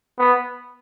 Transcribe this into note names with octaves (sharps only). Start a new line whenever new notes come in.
B3